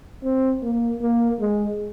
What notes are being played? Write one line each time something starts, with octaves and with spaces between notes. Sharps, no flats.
C4
A#3
A#3
G#3